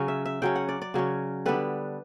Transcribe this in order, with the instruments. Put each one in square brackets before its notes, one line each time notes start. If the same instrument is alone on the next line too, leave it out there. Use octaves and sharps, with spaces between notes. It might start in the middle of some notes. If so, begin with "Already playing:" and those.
Already playing: [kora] C#3 F#3 C#4
E5
E5
C#3 F#3 C#4 G5
F#5
D5
D5
C#3 F#3 C#4
D3 G3 B3 D4 B4